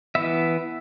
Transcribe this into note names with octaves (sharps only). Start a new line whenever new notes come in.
E3 B3 E5